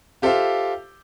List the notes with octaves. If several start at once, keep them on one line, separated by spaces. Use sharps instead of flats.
F4 G4 A4 C5 E5 F5